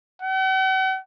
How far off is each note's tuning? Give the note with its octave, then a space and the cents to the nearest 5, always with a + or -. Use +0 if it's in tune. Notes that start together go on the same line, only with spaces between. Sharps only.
F#5 +45